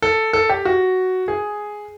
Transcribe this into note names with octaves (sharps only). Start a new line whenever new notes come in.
A4
A4
G4
F#4
G#4